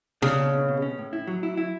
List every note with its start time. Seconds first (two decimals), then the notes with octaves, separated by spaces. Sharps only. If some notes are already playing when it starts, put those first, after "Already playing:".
0.22 C#3 D4
0.38 B2
0.53 B2
0.68 B2
0.82 C#4
0.98 A2
1.13 E4
1.27 F#3
1.43 E4
1.57 E4